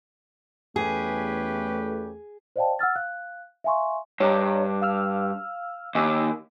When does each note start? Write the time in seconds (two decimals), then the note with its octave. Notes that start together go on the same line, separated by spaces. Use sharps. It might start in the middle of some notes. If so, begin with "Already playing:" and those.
0.76 E2 A3 C#4 G4 G#4 B4
2.56 C5 D5 D#5 F5 G5 A5
2.79 F#5 E6 F6 A6
2.96 F5 F#6
3.64 E5 F5 G#5 C6 C#6
4.20 G2 C#5 D#5 A#5
4.82 F5 E6 F6
5.95 D#2 D#5 G#5 E6